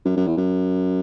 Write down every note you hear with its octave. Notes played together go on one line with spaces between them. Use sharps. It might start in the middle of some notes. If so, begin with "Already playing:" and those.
F#2
F#2
E2
F#2